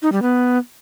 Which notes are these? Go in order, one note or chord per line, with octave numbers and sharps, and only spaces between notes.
D#4
G3
B3